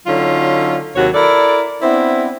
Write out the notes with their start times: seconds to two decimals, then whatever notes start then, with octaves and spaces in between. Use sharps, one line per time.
0.06 D3 F#3 C#4 D#4 F4
0.95 D#2 C3 F#3 F#4 C#5
1.14 E4 A4 A#4 D5
1.82 B3 C4 D4 E4